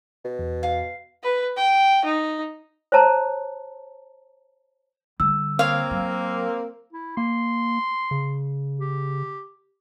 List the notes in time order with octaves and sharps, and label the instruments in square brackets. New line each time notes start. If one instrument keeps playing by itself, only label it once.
[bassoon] B2
[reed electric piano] E2
[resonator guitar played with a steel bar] F5
[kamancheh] B4
G5
D#4
[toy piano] C5 C#5 A5 A#5
[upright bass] D3 G3 [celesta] E6
[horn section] A#3 C4 [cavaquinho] C#5 F5
[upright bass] F#3
[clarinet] E4
[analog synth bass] A#3 [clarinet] C6
[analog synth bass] C#3
[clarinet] G4